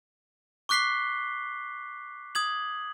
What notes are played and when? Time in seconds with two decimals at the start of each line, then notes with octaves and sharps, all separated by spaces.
0.69 C#6 D6 F#6 B6 C7 G7
2.35 D#6 G#6 F#7